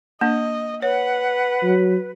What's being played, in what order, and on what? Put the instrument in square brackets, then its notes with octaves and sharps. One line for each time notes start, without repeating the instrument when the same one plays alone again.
[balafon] A#3 D4 [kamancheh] D#5
[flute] B4 [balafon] C#5 [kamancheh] F#5
[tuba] F#3